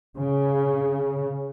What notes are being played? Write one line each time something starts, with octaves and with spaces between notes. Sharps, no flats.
C#3